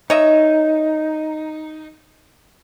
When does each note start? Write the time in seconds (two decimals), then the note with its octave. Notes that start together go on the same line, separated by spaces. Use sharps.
0.10 D#4 C#5 D#5 E5